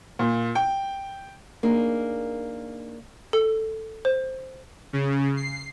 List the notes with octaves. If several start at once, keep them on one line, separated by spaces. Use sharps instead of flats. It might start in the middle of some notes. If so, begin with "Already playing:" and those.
A#2
G5
A#3 D4 D#4 G#4 A#4
A4
C5
C#3
C7